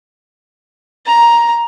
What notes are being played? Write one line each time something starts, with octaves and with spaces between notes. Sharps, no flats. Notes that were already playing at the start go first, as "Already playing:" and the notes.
A#5